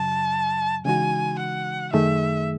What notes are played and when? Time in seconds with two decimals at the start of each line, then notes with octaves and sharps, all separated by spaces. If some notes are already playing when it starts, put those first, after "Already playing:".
Already playing: F#2 C#3 F#3 A5
0.85 C#3 E3 G#3 D#4 F#4 G#5
1.39 F#5
1.93 F#2 D#3 A3 D#4 G#4 E5